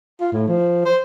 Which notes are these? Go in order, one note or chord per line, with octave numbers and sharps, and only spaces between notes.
F4
A2
F3
C5